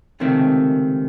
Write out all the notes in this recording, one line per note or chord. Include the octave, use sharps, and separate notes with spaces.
C#2 C3 D#3 A3 C4